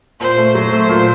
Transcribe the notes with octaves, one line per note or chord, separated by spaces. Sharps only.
A#2 C5
A3
F#3
A3
A#2